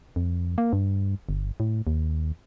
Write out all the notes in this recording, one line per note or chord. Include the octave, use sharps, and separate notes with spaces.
F2
A#3
G2
G1
A2
D#2